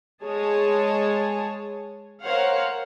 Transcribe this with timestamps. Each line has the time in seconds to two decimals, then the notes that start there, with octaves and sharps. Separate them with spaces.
0.24 G#3 G#4 C#5 A5
2.23 A#4 C5 C#5 F5 F#5